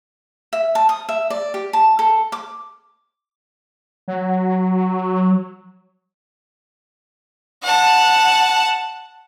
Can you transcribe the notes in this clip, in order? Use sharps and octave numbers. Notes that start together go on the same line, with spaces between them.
E5
A5
D#6
E5
D5
G4
A5
A4
D6
F#3
F#5 A5